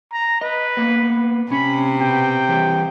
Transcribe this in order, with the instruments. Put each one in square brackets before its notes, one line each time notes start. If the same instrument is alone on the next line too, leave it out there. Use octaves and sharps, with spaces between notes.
[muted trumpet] A#5
[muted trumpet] B4 [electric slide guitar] D#5
[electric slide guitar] A#3 B3
[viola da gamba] C3 [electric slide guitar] C#4 [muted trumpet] B5
[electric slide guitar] B2 [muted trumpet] G5
[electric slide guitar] E3 G3 G4